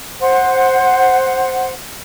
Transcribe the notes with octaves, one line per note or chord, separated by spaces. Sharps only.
C5 F#5